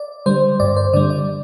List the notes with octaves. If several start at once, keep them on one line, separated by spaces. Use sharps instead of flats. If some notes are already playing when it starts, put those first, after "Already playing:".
Already playing: D5
D3 G3 C5
G2 D5
C5
D3 G3 D5
D5